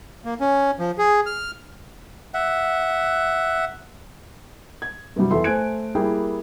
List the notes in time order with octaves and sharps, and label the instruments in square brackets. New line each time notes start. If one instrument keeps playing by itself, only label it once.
[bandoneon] A#3
C#4
F3
G#4
F6
[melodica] E5 F#5
[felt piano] G#6
G2 C3 F#3 G3
E2 A4 E5 C6
A3 C5 G#5 F#6 G#6 D7
G3 A#3 E4 G#4 A#4 G5